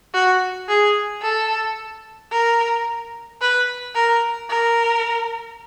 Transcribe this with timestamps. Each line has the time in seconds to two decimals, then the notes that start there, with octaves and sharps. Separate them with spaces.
0.14 F#4
0.68 G#4
1.22 A4
2.32 A#4
3.41 B4
3.95 A#4
4.50 A#4